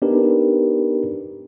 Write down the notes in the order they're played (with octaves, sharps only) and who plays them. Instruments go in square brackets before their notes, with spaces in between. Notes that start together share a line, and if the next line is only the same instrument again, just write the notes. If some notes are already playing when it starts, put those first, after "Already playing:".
[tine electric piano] B3 D4 D#4 G4 A#4 B4